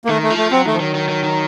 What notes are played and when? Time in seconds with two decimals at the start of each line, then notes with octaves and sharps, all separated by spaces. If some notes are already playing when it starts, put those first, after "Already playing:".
0.05 A#3
0.08 D#3 A3
0.23 A3
0.30 F3
0.38 A3
0.51 F#3 C4
0.65 D#3 A3
0.74 F3
0.80 D#3 F#3
0.95 D#3
1.09 D#3
1.24 D#3